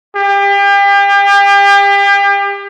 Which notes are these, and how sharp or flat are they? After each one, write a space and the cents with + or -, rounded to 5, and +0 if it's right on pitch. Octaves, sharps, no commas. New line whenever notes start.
G4 +35